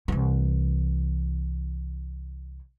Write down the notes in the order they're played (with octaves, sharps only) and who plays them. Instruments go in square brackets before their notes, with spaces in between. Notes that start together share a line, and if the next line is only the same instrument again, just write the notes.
[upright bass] C2 E3